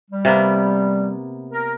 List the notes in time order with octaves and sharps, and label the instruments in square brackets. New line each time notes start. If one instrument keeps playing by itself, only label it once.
[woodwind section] G3
[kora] C3 A#3 B3
[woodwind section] A#4